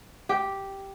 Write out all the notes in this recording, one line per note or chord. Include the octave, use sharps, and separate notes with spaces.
G4